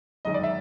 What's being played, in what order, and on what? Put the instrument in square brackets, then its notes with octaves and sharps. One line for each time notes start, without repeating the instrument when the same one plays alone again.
[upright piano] G1 F#2 D#3 G#3 D#5
D5
E5